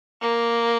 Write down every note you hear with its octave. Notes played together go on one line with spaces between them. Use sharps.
A#3